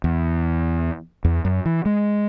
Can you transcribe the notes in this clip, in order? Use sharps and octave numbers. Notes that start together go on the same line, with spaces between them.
E2
E2
F#2
E3
G#3